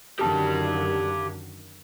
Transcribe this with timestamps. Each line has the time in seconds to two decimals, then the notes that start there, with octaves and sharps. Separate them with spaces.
0.19 F#2 D3 D#3 G4 A5